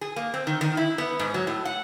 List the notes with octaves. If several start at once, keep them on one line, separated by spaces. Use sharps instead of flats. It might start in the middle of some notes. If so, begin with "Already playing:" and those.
G#4
A#3
C4
D#3
D#3
E4
B3
G#2
F#3
A2
F#5